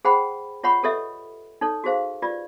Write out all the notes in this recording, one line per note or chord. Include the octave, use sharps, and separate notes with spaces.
G#4 C5 F#5 G5 B5
F4 C#5 F#5 B5 C#6
G4 A4 B4 C#5 D#5 E5
D#4 A4 C#5
F#4 G#4 C5 F5
F4 G4 B4 D5